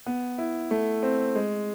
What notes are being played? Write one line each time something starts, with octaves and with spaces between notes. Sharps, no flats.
B3
E4
A3
C4
G#3